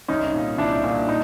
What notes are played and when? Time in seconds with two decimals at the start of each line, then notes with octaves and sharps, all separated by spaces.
0.08 C2 C#4 D#4
0.34 A#2
0.58 C2 D4 E4
0.84 A#2
1.09 D#4